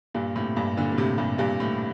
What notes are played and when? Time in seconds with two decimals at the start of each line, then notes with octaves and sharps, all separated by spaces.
0.14 G2 A#2
0.35 A2 C3
0.56 G2 A#2
0.77 A#2 D3
0.92 A#2
0.98 A2 C3
1.18 G2 A#2
1.38 G2 A#2
1.60 A2